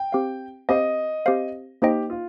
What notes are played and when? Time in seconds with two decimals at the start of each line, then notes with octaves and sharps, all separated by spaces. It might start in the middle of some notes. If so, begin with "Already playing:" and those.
Already playing: G5
0.12 C4 G4 C5 F5
0.69 C4 G4 C5 D#5 F5
1.26 C4 G4 C5 F5
1.82 A#3 D#4 G4 C5 D#5 G5
2.10 F4